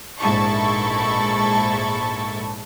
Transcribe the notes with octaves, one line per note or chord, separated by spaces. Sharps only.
A#1 G#2 E4 A4 C#6